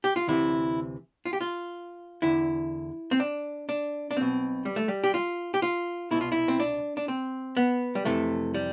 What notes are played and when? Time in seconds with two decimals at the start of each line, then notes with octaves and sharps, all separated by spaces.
0.04 G4
0.16 F4
0.27 D2 C3 E3 E4
1.26 F4
1.33 G4
1.41 F4
2.22 E2 D3 E4
3.11 C4
3.20 D4
3.69 D4
4.11 D4
4.16 B1 B2 C4
4.65 G3
4.76 A3
4.88 G3
5.04 G4
5.14 F4
5.54 G4
5.62 F4
6.11 C2 B2 E4
6.21 F4
6.32 E4
6.48 C4
6.60 D4
6.97 D4
7.08 C4
7.57 B3
7.95 G3
8.05 F2 C3 E3 A3
8.54 G3